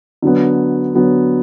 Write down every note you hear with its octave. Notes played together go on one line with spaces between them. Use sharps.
D3 F#3 B3
D3 F#3 B3